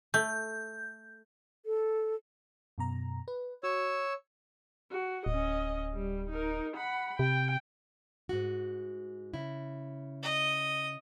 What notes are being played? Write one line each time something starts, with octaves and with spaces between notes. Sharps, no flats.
A3 G6
A4
F#2 B2 A#5
B4
F#4 C#5 E6
F#4
D1 C#4 D#5
G3
D#4 A#4
F#5 B5
C3 G5
G#2 F#4
C#3 E4
D#5